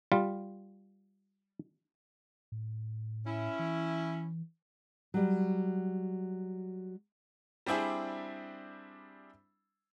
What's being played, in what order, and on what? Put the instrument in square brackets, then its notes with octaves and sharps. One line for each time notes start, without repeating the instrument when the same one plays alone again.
[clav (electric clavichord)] G3 F4
[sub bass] A2
[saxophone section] C#4 E4
[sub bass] E3
[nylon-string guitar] F#3 G3
[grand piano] G3 C4 D4 E4 G#4